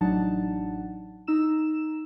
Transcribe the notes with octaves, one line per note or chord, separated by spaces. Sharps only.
A1 F#3 D4 D#4 F#5 A5
D#4 A#5 E6 E7